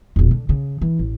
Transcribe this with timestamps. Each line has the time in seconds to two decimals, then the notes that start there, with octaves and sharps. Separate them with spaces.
0.16 E1 A#1
0.31 D3
0.49 C#3
0.81 E3
0.99 A1